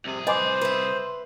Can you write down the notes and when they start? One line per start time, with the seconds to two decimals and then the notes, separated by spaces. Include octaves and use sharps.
0.05 C2 C3 G#4
0.27 B4 C5 D#5 G#5 D6
0.61 B4 E5